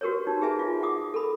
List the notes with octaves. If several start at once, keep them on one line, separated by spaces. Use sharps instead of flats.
F#4 G4 A#4 B4 C#5
D#4
G#4 B4 E5 G#5 A#5
F4 E5
F#5 D6 D#6
A4 A#4 B5